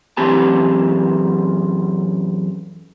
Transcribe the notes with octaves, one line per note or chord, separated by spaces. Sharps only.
F#2 E3 C4 G4 A5